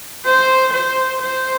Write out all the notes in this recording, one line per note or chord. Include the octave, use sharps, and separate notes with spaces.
C5
C5
C5